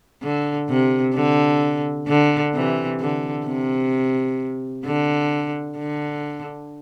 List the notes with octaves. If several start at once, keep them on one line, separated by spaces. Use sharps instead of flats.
D3
C3
D3
D3
C3 E3
D3
C3
D3
D3